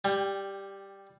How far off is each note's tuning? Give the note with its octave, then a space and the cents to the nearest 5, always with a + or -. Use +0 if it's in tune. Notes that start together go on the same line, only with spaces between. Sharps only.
G3 +0 G5 +25